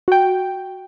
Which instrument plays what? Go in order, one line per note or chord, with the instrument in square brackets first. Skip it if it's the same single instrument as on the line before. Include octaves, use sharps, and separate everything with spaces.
[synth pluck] F#4 G5